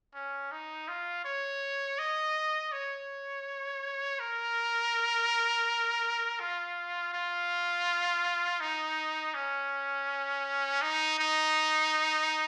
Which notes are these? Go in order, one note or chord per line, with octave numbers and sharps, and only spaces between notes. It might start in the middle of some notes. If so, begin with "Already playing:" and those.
C#4
D#4
F4
C#5
D#5
C#5
A#4
F4
F4
D#4
C#4
D#4
D#4